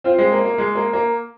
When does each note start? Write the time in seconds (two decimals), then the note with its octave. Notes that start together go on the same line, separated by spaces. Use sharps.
0.04 C4 F4
0.18 G#3 C4
0.32 A#3
0.44 A#3
0.58 G#3
0.75 A#3
0.93 A#3